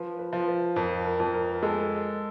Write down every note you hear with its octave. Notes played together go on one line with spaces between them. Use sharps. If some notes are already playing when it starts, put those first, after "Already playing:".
Already playing: F3 B4
B4
F3
B4
F2 A#4
A#4
F2
A#4
G#3 A4